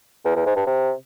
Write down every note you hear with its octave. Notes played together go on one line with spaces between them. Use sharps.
E2
E2
G#2
G2
C3